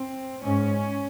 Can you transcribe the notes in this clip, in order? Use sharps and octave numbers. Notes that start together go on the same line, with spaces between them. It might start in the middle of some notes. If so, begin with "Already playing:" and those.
Already playing: C4
G#2 C#4